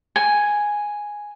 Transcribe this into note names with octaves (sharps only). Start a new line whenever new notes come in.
G#5